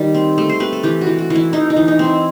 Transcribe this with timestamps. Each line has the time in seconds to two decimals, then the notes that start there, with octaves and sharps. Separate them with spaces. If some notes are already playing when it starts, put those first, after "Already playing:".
Already playing: D#3 G3
0.14 C4
0.38 A3
0.49 C5
0.60 C4 B4
0.72 A4
0.83 E3 G4
1.01 F#4
1.07 E3
1.18 F#4
1.30 E3
1.36 E4
1.53 E3 D#4
1.70 D#4
1.76 E3
1.88 D#4
1.99 C4
2.05 E4